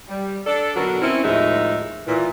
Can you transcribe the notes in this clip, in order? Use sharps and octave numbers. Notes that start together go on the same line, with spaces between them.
G3
D4 A4 D5
B2 D3 F#3 F#4 A#4
C4 C#4 E4
D#2 A2 F3 G#3 D#4 E5
A#2 E3